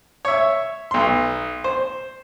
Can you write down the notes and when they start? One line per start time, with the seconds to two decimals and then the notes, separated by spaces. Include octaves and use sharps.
0.25 C#5 E5
0.91 B1 C6
1.64 C5